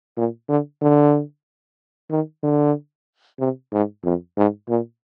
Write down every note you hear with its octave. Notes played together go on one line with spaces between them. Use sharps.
A#2
D3
D3
D#3
D3
C3
G#2
F2
G#2
A#2